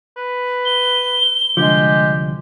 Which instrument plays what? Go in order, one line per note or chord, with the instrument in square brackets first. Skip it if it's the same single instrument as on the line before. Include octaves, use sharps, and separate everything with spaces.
[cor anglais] B4
[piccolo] G7
[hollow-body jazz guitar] C2 D3 F3 [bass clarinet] G#3 [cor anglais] G4